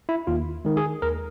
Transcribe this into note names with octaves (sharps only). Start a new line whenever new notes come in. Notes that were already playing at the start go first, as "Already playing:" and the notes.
E4
D#2 F4
D#3 G#3
G#4
D#2 A#4